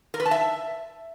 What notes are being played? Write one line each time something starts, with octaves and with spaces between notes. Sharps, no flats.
A#4
B4
A5
E5